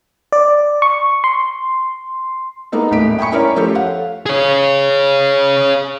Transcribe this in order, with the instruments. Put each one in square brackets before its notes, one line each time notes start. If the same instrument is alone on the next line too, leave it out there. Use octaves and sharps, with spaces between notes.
[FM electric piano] D5
C#6
C6
[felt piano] G#3 A#3 B3 D#4 A4
D#1 A1 A2 B6 D7
G5 G#5 B5 C#6 C#7
C#4 E4 A#4 C#5 D5
F3 A3 G4 A4 C5
C#5 F5 F#5
[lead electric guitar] G#4 C#5